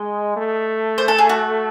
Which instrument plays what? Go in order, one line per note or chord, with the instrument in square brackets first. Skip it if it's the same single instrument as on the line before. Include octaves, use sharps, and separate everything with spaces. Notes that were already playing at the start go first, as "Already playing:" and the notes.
Already playing: [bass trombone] G#3 [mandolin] D#5
[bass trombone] A3
[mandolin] C5
A4
G#4
F#4